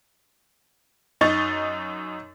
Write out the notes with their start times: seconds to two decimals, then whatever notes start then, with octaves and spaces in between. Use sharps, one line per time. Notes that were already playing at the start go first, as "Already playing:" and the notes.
1.21 F#2 D#4 D#5 C#6 A6